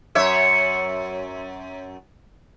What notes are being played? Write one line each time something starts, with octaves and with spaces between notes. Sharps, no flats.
F#2 C#5 E5